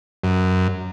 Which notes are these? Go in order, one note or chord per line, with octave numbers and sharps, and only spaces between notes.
F#2